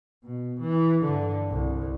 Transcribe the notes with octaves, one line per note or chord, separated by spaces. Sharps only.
B2
E3
G2 D3
C2